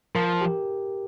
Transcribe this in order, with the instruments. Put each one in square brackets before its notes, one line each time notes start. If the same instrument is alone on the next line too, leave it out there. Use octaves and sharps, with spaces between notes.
[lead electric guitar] F3 [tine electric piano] A#4
[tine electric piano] G4